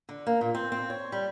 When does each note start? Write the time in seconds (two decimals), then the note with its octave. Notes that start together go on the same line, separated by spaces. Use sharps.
0.09 D3
0.27 A#3
0.41 A#2
0.55 C4
0.72 C4
0.90 C#5
1.12 G3